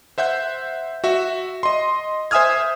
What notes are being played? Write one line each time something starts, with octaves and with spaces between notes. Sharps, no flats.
C5 E5 F#5 G6
F#4 E5
D#5 C6
C5 E5 G#5 D#6 F6 G#6